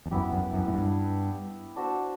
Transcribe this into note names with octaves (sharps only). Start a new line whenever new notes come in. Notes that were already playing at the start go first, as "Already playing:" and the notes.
E2
F#2 B3 E4 G4
F#2
F#2
A2
G2
D4 F#4 C5 E5